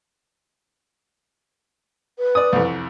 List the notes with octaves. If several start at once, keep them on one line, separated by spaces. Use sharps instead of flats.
B4
D5 D#6
C2 F2